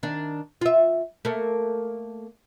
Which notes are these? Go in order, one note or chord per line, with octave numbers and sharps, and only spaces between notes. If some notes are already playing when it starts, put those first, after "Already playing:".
D#3 D4
F4 E5
A3 A#3